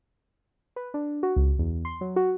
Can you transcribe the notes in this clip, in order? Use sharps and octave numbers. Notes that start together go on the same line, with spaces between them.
B4
D4
F#4
C#2
E2
C6
F#3
F#4